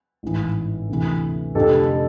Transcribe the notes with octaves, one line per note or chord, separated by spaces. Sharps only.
A1 G#2 E3
D2 C3 E3
F1 F2 D3 G4 A4